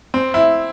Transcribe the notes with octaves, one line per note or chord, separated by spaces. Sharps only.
C4
E4